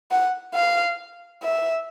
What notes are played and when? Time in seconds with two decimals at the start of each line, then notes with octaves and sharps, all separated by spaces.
0.11 F#5
0.55 F5
1.43 E5